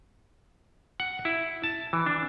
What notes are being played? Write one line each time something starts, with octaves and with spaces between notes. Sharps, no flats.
F#5
E4
A5
E3
D4